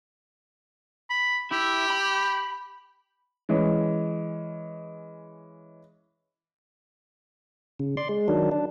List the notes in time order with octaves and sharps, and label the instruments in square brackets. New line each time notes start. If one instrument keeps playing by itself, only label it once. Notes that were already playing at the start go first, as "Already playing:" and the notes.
[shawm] B5
[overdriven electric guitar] E4 [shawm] G4
[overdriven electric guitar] B5
[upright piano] E3 G#3 C#4
[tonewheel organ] C#3
D5 C6
G#3
D#3 F#3 D4
D4